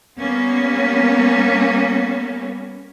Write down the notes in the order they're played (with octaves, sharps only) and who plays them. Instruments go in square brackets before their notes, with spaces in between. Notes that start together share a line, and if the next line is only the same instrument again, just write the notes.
[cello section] G3 A#3 B3 C#4